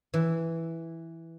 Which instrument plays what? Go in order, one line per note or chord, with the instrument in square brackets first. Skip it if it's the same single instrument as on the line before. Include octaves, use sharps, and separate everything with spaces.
[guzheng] E3